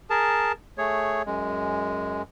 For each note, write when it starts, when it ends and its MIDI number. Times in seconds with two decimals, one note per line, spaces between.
0.10 0.52 68
0.10 0.52 70
0.10 0.52 81
0.78 1.22 57
0.78 1.22 68
0.78 1.22 73
1.26 2.22 42
1.26 2.22 56